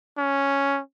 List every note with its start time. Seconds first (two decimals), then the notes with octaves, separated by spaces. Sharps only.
0.18 C#4